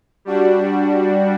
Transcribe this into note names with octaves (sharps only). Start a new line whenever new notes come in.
G3 D4 F#4